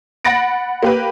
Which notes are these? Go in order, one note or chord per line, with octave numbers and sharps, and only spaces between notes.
F#5 B5 A6 A#6 D7
A#3 G4 B4